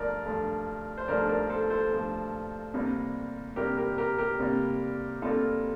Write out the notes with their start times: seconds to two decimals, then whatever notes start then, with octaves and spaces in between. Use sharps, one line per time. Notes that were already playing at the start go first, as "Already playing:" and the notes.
Already playing: G2 F3 A3 A#4 D5
0.26 G2 F3 A3
0.98 C5
1.08 G2 F3 A3 A#4 D5
1.29 A#4 D5
1.50 A4 C5
1.70 A4 C5
1.91 G2 F3 A3
2.74 C2 C3 G3 A#3
3.56 C2 C3 G3 A#3 G4 A#4
3.77 G4 A#4
3.98 G4 A#4
4.18 G4 A#4
4.39 C2 C3 G3 A#3
5.22 C2 C3 G3 A#3 F4 A4